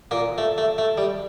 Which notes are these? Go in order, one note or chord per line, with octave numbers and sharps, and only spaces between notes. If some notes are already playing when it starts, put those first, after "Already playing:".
A#2 A#3
A3
A3
A3
G3